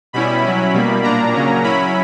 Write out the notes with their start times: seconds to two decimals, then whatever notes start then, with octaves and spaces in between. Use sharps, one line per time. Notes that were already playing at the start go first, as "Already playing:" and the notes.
0.13 B2 G3 C#4 E4 B5
0.43 F#3 C#4 E4
0.74 B2 G3 A#3
1.04 A#2 A#3 D4 A#5
1.34 C#3 F#3 A#3 C#4
1.64 F#3 C#4 E4 B5